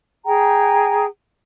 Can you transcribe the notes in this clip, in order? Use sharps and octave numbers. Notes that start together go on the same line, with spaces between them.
G#4 G5 A#5